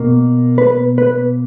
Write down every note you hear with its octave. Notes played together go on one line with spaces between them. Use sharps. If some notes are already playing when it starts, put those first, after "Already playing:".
Already playing: B2 A#3
B4
B4